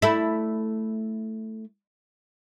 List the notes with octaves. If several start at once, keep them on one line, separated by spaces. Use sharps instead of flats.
A3 E4